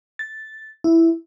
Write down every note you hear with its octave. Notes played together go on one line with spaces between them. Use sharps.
A6
E4